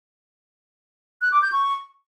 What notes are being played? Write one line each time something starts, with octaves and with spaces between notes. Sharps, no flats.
F#6
D6
G6
C#6